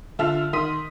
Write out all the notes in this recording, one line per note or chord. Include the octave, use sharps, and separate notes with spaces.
D3 F4 E5 A5 F6 F7
D#3 C6 D#6 B6 D#7